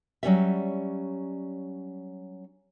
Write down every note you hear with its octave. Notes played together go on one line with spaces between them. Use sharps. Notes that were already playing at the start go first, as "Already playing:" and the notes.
F#3 G3 C#4 C#5 D5 E5